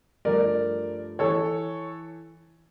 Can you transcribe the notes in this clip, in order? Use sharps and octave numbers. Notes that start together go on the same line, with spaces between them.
G2 F3 A3 A#4 D5
E3 A4 C#5